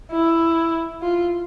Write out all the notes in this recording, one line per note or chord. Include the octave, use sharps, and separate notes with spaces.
E4
F4